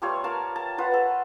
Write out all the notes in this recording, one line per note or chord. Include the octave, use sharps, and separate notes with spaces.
G3 A3 F4 C#5
A#4 F5 A5
A5
F4 B4 F#5
A4